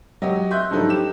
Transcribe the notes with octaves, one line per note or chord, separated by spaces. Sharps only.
F#3 F#4 G4 D#5
D#5 E5 C6 F#6 G6
G2 F3 F#3 D#4 A4
G4 E7